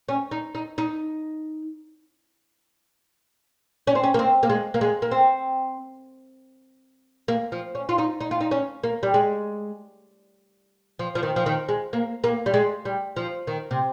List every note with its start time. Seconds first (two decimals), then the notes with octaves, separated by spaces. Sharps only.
0.09 C#4
0.31 D#4
0.55 D#4
0.78 D#4
3.87 C#4
3.95 C4
4.04 C#4
4.14 A#3
4.19 C4
4.43 A#3
4.49 G#3
4.74 A#3
4.81 G#3
5.02 A#3
5.11 C4
7.28 A#3
7.52 F3
7.75 C#4
7.89 F4
7.98 D#4
8.20 D#4
8.31 F4
8.41 D#4
8.51 C#4
8.83 A#3
9.03 G3
9.14 G#3
10.99 F3
11.15 F3
11.23 D#3
11.36 F3
11.46 D#3
11.69 G#3
11.93 A#3
12.24 A#3
12.46 G3
12.54 G#3
12.85 G3
13.16 F3
13.47 D#3
13.71 C3